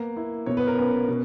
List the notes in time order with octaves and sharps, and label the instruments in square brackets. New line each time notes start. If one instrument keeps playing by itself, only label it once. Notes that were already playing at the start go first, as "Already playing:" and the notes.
Already playing: [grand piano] A#3 B3
E4
B2 C#5
B4
A#4
B3 C#4 B4
B2